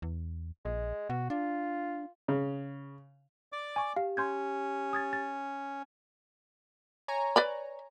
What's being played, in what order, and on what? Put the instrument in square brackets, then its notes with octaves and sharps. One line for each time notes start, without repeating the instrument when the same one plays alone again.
[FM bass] E2
[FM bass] A#1 [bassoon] G#3
[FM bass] B2 [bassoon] F#4
[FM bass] D4 [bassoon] F4
[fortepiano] C#3
[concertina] D5 D6
[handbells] G#5 C#6
[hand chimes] G4 [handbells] F5
[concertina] C#4 [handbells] C6 G6 G#6
[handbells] D#6 G#6 A6
A6
[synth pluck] C#5 G#5 A#5
[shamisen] B4 D5 B5